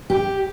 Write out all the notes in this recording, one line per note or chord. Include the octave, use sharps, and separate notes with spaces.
G4